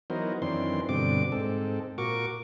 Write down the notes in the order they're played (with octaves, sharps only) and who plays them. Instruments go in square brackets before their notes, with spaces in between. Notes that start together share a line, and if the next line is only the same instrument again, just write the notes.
[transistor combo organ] E3 F#3 B3 D#4 A#4 C5
F#2 D#3 E3 C4 D4 C6
G2 B2 D3 C4 D6
G#2 C4 A4
A#2 F#4 A#4 C#6 D6